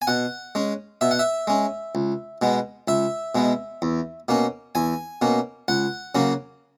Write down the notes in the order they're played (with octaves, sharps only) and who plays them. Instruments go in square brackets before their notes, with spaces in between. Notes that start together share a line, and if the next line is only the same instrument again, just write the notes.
[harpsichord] G#5
B2 F#5
G#3 C#4
B2 E5
F#5
E5
G#3 C#4
C#2
B2 G#3 B3
C#2 E5
B2 G#3 B3
E2
B2 A#3 C#4
E2 G#5
B2 A#3 C#4
C#2 F#5
C#3 F#3 A#3 C#4